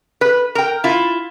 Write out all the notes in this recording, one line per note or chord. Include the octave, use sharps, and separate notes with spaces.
B4
A#4 G5
E4 F4